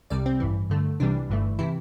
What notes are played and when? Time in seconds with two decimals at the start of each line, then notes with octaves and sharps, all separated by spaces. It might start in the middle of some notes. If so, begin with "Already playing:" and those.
0.10 C2 C3 G3 D5
0.26 C4
0.40 A1 G2 E3
0.70 G2 D3 A3
1.00 C2 C3 E3 G3 D4
1.30 G1 G2 E3 A3
1.59 C3 E3 E4